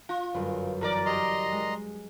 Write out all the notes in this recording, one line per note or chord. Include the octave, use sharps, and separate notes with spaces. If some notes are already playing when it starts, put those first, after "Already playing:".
F4
G1 F#2 B4
E3 A#4 D5
G4 D#5 A#5 C6 E7
G#3